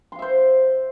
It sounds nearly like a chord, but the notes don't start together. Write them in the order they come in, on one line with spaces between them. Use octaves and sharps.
C6 F5 E5 C5